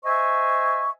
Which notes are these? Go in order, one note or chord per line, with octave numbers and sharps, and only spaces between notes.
C5 D#5 E5 G#5 C#6